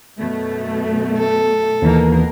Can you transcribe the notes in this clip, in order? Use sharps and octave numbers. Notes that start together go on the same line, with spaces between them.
F#2 B2 A3
A4
D#2 B2 E3 A#3 A#4